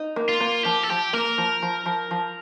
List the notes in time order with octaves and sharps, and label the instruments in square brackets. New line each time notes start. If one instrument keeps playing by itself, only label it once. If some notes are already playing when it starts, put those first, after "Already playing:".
Already playing: [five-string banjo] D#4
A#3
[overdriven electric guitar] F4
[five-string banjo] A#3
[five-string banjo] F3 [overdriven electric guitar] G4
[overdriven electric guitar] A4
[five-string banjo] F3 [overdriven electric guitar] G4
[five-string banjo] A#3 [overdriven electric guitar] A#4
[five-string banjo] F3
F3
F3
F3